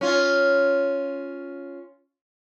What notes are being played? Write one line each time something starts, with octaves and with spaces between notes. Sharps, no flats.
C#4 F4